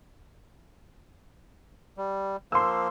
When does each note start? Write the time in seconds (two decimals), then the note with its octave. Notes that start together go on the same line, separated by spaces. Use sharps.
1.97 G3
2.52 F3 A#3 C6 E6